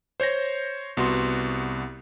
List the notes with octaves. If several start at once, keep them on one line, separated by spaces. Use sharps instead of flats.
C5 C#5 G6 A#6
C2 B3 F#4 C6